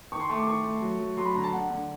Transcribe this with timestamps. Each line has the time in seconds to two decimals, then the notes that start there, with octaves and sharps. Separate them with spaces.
0.12 D#3 C#6
0.20 C6
0.29 A3 C#6
0.37 D6
0.47 D#3 C#6
0.64 A3
0.81 F#3
0.99 F#3
1.17 F#3 C6
1.26 B5
1.35 D3 A#5
1.44 A5
1.52 D3 F#5
1.70 D3